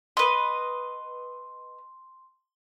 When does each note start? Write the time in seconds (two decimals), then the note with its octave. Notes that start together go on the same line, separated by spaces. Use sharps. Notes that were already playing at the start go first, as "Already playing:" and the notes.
0.17 B4 D#5 C6